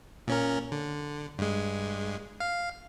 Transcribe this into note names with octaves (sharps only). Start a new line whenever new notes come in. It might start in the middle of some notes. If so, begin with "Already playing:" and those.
A#2 C#4 A#4
D3
G2 G#3
F5